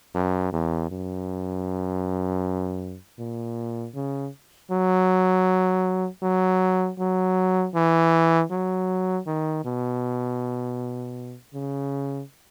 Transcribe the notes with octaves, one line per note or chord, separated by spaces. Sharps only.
F#2
E2
F#2
A#2
C#3
F#3
F#3
F#3
E3
F#3
D#3
B2
C#3